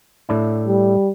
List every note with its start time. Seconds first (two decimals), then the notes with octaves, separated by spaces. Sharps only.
0.29 A2 D4 E4
0.67 G3